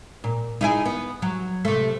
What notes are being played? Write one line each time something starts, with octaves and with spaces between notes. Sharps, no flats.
A#2
D#4 E4 G#4
B3
F#3
C3 A3